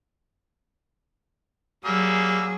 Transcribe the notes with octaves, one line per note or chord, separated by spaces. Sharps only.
F#3 G3 A#3 G#4 E6